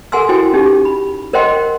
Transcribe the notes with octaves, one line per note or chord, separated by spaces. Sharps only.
A4 A#4 F#5 G#5 C6 E6
E4 F#4 A4 C5 G5 G#5
C#4 D#4 G4
B5
A#4 C5 D#5 F#5 G5 C6